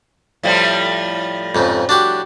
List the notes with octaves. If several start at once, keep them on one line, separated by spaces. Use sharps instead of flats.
A2 F3 G3
F2 G#2 C#3
D4 F#4 G4